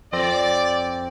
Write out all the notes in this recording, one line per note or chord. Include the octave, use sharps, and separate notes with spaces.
F2 C4 D5 A#6